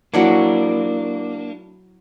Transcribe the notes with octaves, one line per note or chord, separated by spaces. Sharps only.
F#3 A#3 D4 E4 C#5